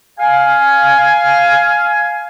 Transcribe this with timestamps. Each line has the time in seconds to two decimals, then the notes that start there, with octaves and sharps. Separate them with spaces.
0.19 F5 G#5